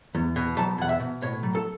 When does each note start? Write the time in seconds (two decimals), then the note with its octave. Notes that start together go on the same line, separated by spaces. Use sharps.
0.15 E2
0.36 B2
0.57 F#3 A5
0.78 E2 F#5
0.89 E5
1.00 B2
1.22 A2 C#5
1.43 F#3
1.55 A4